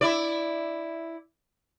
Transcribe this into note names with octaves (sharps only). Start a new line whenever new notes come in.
E4 D5